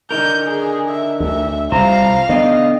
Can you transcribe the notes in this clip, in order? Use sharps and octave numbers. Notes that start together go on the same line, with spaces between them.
D3 D#4 A#4 G6
G#4
E5
D2 E5
C2 F4 C5 F5 A#5
D3 B3 D#4 D#5 G5